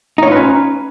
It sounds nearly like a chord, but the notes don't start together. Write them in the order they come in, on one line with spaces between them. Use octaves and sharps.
D#4 C#5 F4 B4 C#4